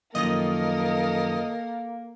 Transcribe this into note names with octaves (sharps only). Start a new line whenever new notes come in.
F#2 D#3 F3 A#3 A4 A#4 D#5